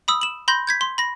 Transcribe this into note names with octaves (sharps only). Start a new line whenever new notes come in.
B5 D#6 E6
E7 F#7
B5 C6 G6 A#6
G6 G#6 B6
C6
B5 A#6